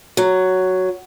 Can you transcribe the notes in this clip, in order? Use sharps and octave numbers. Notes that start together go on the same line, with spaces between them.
F#3